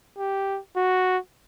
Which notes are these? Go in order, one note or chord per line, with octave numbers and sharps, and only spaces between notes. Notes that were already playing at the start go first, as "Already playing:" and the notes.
G4
F#4